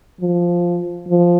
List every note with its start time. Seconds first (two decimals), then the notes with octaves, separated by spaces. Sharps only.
0.21 F3
1.09 F3